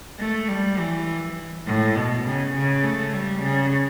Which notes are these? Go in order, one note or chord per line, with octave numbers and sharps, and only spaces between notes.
A3
G3
E3
A2
B2
C#3
C#3
A3
G3
C#3